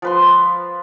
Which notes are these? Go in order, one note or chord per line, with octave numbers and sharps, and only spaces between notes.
F3 B4 C6